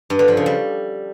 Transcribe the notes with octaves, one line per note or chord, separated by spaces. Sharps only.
G2
D3
F3
C#3
G3